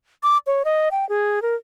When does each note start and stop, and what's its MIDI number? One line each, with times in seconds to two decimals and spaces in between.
0.23 0.38 86
0.47 0.63 73
0.65 0.89 75
0.91 1.07 79
1.09 1.42 68
1.42 1.55 70